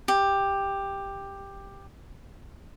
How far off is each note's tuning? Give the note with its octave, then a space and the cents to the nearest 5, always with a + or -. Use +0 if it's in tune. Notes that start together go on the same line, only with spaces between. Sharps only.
G4 +10